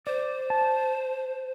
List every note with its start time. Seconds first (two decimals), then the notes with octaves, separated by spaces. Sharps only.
0.07 C5 D5
0.50 A5